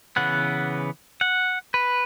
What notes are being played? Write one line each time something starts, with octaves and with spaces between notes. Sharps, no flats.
C#3 E3 B3 F#5
F#5
B4